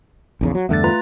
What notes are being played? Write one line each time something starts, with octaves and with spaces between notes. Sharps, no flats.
A#1 E2 C#3
F#3
E2 G2 D3 A3 A6
F4 B4 A#5